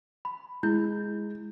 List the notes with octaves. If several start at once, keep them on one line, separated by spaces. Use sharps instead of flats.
B5
G#3 E4 G6